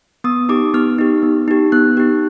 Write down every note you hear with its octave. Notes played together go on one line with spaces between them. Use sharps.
B3 D#6
D#4 G4 D6
B3 F6
D#4 G4
B3
D#4 G4
B3 F#6
D#4 G4